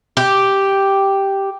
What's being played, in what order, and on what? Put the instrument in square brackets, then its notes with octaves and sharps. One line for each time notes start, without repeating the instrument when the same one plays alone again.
[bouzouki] G4